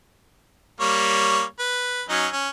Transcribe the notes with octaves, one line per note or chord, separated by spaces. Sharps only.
G3 A#3 C#5
B4
F#3 C#4 D#4
C#4